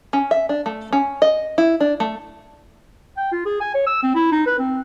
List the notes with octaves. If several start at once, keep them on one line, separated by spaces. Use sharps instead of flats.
C#4
E5
D4
A3
C#4
D#5
E4
D4
A3
G5
F4
G#4
G#5
C#5
E6
C4
E4
D#4
B4
C4